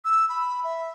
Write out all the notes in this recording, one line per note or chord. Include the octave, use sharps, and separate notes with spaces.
E6
B5
E5